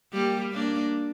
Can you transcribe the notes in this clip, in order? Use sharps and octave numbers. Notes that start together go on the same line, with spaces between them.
G3 A#3
A#3 D4